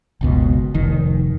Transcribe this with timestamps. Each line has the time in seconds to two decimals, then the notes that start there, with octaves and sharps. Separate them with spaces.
0.21 F#1 C#2 B2
0.74 F1 D#3